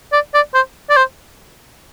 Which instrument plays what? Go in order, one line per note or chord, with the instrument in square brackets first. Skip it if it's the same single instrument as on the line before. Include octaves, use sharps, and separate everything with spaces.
[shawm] D5
D5
C5
D5
C5